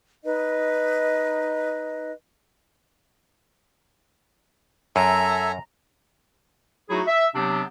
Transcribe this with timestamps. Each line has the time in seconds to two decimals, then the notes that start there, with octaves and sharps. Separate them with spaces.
0.24 D#4 B4 D#5
4.96 F#2 A4 E5 G#5 A#5
6.90 F#3 A3 D#4 E4 F#4 G#4
7.07 E5
7.35 C3 F#3 B3 C4 D4 G4